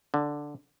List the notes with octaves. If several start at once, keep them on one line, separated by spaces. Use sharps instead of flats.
D3